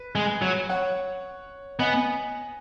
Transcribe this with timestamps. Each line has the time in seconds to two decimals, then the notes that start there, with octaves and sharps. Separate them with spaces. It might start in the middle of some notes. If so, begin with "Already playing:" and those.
Already playing: B4
0.15 G#3
0.42 F#3
0.69 C#5 F#5
1.79 B3 D#5 G#5